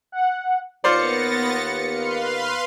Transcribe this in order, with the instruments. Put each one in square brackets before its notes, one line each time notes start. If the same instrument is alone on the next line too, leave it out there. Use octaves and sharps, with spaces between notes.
[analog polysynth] F#5
[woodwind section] D#2 [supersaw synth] B3 A6 A#6 [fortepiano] F4 C5 D5 [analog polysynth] C#7
[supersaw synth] B4 F5 C6